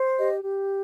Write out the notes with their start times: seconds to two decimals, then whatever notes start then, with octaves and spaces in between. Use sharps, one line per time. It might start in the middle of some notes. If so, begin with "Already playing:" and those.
Already playing: C5
0.18 G4 D#5
0.44 G4